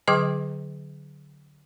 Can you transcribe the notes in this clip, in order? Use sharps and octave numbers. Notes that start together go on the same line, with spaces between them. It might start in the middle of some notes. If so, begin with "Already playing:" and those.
D3 F#3 G#4 D#5 G5 D6